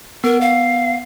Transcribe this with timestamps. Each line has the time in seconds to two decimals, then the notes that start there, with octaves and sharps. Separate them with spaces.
0.24 B3 A#4
0.41 F5